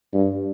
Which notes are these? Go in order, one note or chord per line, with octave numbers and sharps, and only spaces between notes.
G2